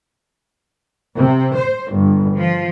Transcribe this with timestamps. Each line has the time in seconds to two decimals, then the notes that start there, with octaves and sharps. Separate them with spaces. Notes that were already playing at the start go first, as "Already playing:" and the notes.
1.16 C3
1.55 C5
1.92 G1
2.36 F3